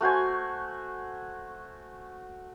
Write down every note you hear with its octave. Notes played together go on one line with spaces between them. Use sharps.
A3 F#4 C5 G#5